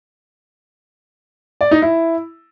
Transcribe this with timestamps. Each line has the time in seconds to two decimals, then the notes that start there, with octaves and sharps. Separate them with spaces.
1.61 D5
1.71 D#4
1.82 E4